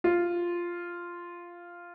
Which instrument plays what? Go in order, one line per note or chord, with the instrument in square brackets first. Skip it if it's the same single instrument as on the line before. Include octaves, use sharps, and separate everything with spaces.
[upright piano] F4